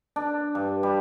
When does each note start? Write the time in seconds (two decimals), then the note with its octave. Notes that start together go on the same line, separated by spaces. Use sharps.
0.16 D4
0.55 G2
0.83 G3